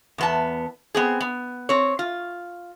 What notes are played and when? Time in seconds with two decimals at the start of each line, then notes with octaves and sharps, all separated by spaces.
0.18 E2 B3 A5
0.95 B3 C4 G#4
1.21 B3
1.69 C4 C#5
1.99 F4